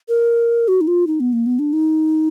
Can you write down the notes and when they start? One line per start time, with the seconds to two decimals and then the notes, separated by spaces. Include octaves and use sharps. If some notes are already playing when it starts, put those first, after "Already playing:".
0.08 A#4
0.68 F#4
0.81 D#4
0.87 F4
1.07 D#4
1.20 B3
1.33 A#3
1.46 B3
1.59 D4
1.73 D#4